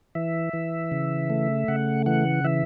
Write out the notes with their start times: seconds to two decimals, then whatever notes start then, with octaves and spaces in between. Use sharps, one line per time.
0.15 E3 E5
0.53 E3
0.92 C#3
1.30 A3
1.68 C#3 F#5
2.06 E3 F#5
2.44 E3 E5